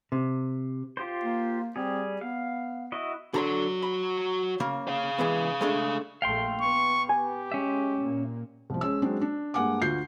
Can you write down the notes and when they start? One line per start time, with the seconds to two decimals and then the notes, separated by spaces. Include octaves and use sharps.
0.12 C3
0.97 F4 G4 C5
1.23 A#3
1.76 G3 C4 G#4
2.21 B3 F5
2.92 E4 F#4 D#5
3.34 D3 F#4 C#5 A#5 C6
3.82 B5
4.60 C#3 A#3
4.88 G#4 F5
5.18 E3 G#3 B3
5.61 G#3 A3 D4
6.22 A#1 A3 F5 G5 C6
6.61 B3 C#6
7.09 G4 G#5
7.52 G#3 C#4 E5
8.00 A#2 A#3
8.70 C2 F3
8.81 G#3 C#4 E6
9.02 F#3 G#3 C4 D4
9.21 D4
9.54 G2 G#3 A#3 F#5 G#5 D6
9.82 D2 F4 F#4 G6 C7